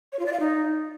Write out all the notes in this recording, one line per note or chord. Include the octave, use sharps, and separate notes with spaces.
C#5
F4
D5
F5
D#4